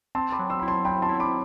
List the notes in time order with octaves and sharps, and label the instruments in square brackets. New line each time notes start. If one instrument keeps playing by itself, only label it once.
[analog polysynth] C4 [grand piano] A5 C6
[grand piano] B5 D6
[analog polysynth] F#3
[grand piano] C6 E6
[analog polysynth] E4 [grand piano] B5
[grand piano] A5 C6
[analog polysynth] F#3 [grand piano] G5 B5
[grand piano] A5 C6
[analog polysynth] E4
[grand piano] B5 D6